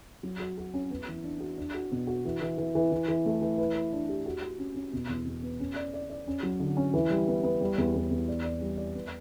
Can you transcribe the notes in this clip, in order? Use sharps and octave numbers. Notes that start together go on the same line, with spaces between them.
F#3
F#4
F#4
C#4
B3
E3
D4
F#4
D4
F#4
B2
F#4
E3
E3
E3
E3
E3
E3
A3
E3
B4
B4
D4
G4
F#4
F#4
C#4
C#4
B2
E2
B2
B3
C#4
D5
D5
D5
C#4
F#3
D3
C#4
E3
G3
B3
B3
G3
E2
E2
E2
D5
D5
G3
D5
B3